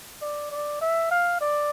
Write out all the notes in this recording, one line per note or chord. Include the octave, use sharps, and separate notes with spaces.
D5
D5
E5
F5
D5